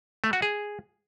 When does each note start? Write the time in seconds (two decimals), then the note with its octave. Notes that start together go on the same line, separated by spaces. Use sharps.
0.24 A3
0.33 F#4
0.42 G#4